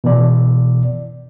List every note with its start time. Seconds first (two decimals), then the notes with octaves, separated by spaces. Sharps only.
0.04 B2 E3 D5